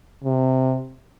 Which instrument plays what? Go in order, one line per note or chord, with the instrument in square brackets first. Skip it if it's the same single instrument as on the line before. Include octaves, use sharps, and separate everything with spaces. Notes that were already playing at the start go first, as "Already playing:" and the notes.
[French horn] C3